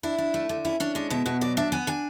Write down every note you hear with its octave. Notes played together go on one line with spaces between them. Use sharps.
D4 E4
D4
A3
D3
C#4 E4
C#4 D4
G#3 D4
B2 E4
B2 F#4
F#3 D5
D4 E5
B3 G#5
D4 G#5